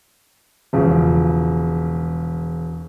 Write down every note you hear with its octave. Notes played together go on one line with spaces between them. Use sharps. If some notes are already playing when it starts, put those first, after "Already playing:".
E1 C#3 F3